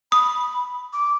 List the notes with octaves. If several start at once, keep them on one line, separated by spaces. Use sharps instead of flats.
B5 D#6
D6